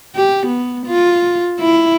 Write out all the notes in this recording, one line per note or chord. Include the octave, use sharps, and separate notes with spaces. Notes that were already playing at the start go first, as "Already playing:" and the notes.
G4
B3
F4
E4